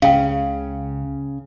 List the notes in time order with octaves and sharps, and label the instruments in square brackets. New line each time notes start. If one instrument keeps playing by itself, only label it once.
[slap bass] C#2 C#4 [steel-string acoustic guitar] C#3 [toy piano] F5 G5